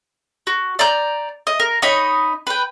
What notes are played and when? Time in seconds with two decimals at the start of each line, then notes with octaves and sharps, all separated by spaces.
0.47 F#4
0.79 D5 A#5 G6
1.47 D#5
1.60 A#4
1.82 D#4 C#5 D#5 B5
2.47 B4 G5